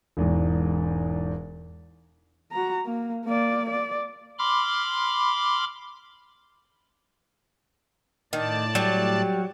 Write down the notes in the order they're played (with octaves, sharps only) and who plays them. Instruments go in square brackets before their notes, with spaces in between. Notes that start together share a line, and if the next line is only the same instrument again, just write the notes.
[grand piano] E1 E2 G#2
[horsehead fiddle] F#4 A#5
A#3
A#3 D5
D5
[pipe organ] B5 C6 D6 F6
[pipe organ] A2 D5 A5 [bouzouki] D#3
[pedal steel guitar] F#3 [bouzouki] G3